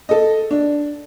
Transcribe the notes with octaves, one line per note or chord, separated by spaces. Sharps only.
A4 D#5
D4